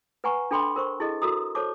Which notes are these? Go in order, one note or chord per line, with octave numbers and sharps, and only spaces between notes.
B4 F#5 G#5 A#5 C#6
D4 A4 G5 B5 C6
A#4 C5 C#6
E4 G#4 A4 D#5
F#4 A4 A#4 A#5 D#6
A4 C5 C#5 A5 D6